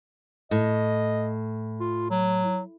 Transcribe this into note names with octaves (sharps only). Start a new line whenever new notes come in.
A2 D#5
F4
F#3